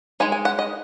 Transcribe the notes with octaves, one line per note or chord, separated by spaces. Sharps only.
G#3 D#4 G#5
G#5
F#5
D#5